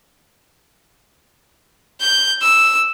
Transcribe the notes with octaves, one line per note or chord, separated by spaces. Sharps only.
G6
E6